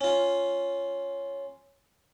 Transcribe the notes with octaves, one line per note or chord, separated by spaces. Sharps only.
C#4 F4